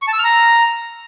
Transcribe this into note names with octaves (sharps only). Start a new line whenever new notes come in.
C#6
A5
E6
F6
A#5